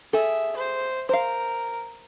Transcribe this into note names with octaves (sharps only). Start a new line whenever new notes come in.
G#4 A4 E5
C5
A#4 C5 F5